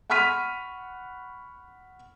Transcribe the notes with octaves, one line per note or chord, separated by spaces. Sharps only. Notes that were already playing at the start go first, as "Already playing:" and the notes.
F#5 B5 C#6 F6 B6 D#7